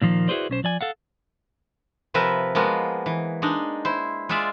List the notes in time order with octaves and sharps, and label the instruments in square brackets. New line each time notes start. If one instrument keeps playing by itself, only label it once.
[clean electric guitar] A#2 D#3 F3 A#3
E4 F#4 G#4 B4 C5 D5
B1 C#4 C5
F3 D5 G#5
A4 F5 F#5
[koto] C3 F3 A#4 B4 E5
F3 G#3 A#3 B3 F#4
E3
G#3 D4 D#4
E4 C5
G#3 F4 D5 E5